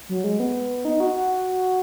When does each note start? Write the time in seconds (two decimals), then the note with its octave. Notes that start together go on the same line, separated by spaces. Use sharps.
0.09 F#3
0.24 G#3
0.40 B3
0.85 D#4
1.00 F#4
1.15 F#4